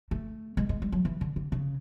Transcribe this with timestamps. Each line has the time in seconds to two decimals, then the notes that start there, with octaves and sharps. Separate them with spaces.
0.11 A3
0.57 G#3
0.69 G#3
0.82 G3
0.92 F#3
1.05 E3
1.21 D3
1.36 D3
1.52 C#3